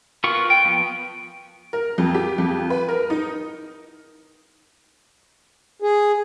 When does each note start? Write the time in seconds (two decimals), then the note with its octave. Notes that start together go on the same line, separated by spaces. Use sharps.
0.24 B3 F4 A#4 F#5 C#6
0.50 G5
0.65 F3 B3
1.73 A#4
1.98 F2
2.15 G4
2.38 F2
2.70 B4
2.89 A#4
3.10 D#4
5.82 G#4